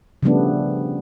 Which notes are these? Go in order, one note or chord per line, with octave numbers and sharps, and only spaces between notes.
C#3 F3 G3 A3 B3 D4